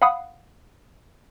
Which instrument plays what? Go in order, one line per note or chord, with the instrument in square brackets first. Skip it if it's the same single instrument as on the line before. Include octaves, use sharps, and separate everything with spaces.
[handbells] F5 F#5 B5 D#6